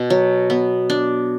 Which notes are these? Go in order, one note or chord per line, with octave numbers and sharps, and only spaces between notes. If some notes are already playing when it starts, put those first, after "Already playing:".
Already playing: B2
F#3
B3
D4